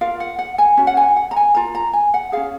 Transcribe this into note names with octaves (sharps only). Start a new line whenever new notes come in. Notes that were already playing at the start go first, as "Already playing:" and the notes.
F4 A#4 F5
F#5
F#5
G#5
C#4 F#4
F#5
G#5
F#5
A#5
G#5
F4 A#4 A#5
A#5
G#5
F#5
C#4 F4 G#4 F5